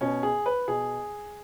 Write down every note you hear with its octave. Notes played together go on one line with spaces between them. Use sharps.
B2 C#4
G#4
B4
B2 G#4